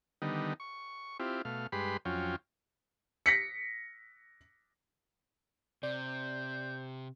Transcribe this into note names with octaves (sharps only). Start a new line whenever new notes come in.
D3 D#3 G3 B3 D#4
C#6
C4 E4 F4 G4
B2 A3 F5
G2 G#3 G4 B4 B5 C6
F2 F#3 C#4 F4 G5
A#6 B6 C#7
C3 C5 D5